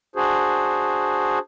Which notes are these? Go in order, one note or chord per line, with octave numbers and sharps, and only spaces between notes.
D4 F#4 G#4 C5